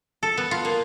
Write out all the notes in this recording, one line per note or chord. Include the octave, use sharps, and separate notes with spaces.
A4
B3
F4
A#3